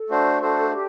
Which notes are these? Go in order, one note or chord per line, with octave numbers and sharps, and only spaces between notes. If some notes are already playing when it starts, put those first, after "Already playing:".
Already playing: A4
A3 D4 F#4 C5
A3 D4 F#4 C5
G4